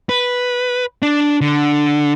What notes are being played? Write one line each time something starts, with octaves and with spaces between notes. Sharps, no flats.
B4
D4
D3